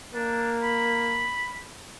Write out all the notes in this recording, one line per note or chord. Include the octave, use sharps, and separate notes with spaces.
A#3 D4
B5